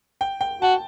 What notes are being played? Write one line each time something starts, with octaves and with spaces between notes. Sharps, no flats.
G5
G5
F#4 A5